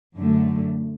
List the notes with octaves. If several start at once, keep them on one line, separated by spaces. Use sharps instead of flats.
F#2 D3 A3